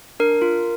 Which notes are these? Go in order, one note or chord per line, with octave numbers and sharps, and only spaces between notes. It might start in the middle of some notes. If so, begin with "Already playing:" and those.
D4 A#4
F4